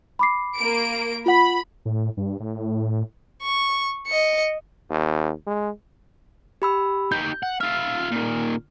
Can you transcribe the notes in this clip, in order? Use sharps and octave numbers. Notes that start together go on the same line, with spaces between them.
B5 D6 C7
A#3 D7
F4 F#5 B5
A2
G2
A2
C#6
D#5 C#7
D#2
G#3
G4 B5 E6
D#4 G4 G6
F#5
F4 E5 F6
A#2 D#3